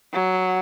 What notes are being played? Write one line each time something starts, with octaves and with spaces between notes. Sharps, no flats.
F#3